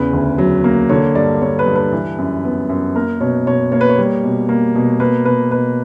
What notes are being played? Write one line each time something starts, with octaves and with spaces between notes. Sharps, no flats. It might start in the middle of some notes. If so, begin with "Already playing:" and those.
Already playing: E2 C#3 B4
D2
F#3
A#3
D3 C#5
G2 D5
A#3 C#5
B4
G2
B4
E3
F#2
B3
F#2
A#3 A#4
B2 C#5
B2 C#5
A#3 C#5
B4
C#5
G3
B2
A#3
B2
A#3 B4
B2 B4
B2 B4